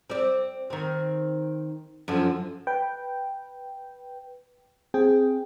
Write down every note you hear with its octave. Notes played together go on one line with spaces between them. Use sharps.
C4 D5
D#3 C4
F#2 D3 F3
B4 G5
C4 G#4 G5